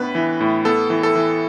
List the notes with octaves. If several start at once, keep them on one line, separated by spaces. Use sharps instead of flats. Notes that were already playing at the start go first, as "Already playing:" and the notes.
Already playing: A2 B3 D4 B4
E3
A2
B3 A4
E3
A4
E3